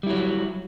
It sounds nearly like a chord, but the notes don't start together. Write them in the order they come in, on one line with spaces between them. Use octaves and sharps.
G3 E4 F#3